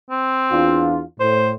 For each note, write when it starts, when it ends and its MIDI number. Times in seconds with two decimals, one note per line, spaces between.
0.10 0.95 60
0.52 1.01 40
0.52 1.01 62
0.52 1.01 65
1.20 1.54 45
1.20 1.50 72